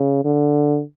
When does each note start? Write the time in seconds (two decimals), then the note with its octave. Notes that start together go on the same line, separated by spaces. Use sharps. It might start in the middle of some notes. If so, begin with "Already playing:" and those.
Already playing: C#3
0.25 D3